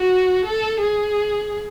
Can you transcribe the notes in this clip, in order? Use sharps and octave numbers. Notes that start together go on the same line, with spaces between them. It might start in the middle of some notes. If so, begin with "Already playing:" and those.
Already playing: F#4
A4
G#4